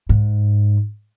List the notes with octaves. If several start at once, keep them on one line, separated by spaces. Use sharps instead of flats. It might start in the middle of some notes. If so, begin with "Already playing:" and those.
G#2